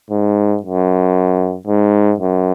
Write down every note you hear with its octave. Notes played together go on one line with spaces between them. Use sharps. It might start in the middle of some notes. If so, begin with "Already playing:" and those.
G#2
F#2
G#2
F#2